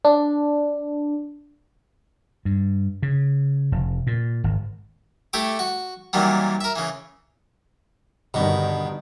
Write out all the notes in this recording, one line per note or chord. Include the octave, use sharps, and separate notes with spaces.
D4
G2
C#3
F1
A#2
G#1
A3 E4 G4 D6
F#4
A#2 D#3 E3 F#3 G3
A#4 E5
C#3 E3
G2 B2 D3 D#3